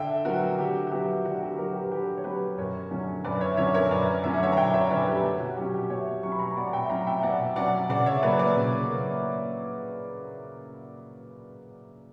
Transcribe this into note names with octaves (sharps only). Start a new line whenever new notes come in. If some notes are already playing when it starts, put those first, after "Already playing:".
Already playing: D3 E5 G5
F#3 B3 F#4 A#4
D3 G4
F#4
F#3 B3 G4
D3 F#4
G4
G4
F#3 B3 F#4 A#4
G4 B4
D3 G4 B4
C#5
F#3 B3 G4 B4
F#2 A#4 C#5
D3 F#3 C#4
F#2 B4 D5
C#5 E5
D3 F#3 C#4 C#5 E5
A#4 C#5
F#2 B4 D5
D3 F#3 C#4 E5
F#5
C#5 E5
A#5
F#2 E5 G5
C#5 E5
D3 F#3 C#4 B4 D5
G4 B4
B2
F#4
F#3 C#4 G4
G4
B2 C#5 E5
F#3 C#4 C#6
B5
A#5 C#6
B2 D5 F#5
E5 G5
F#3 C#4 F#5 A#5
E5 G5
B2 D5 F#5
F#3 C#4 D5 F#5
C#3 D5 F#5
C#5 E5
F#3 A#3 B4 D5
B4 D5
C#3
F#3 A#3